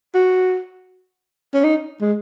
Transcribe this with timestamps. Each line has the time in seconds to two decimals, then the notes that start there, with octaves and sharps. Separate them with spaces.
0.14 F#4
1.54 C#4
1.64 D#4
2.01 G#3